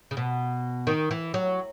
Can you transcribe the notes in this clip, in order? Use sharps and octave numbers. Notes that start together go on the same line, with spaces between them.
C#3
B2
D#3
E3
F#3